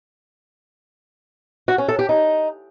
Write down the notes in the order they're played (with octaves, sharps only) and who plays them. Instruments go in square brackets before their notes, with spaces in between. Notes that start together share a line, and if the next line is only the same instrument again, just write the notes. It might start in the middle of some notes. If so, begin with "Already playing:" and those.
[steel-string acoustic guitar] F#4
C#4
A4
G4
D#4